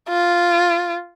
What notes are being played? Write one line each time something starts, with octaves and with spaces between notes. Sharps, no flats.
F4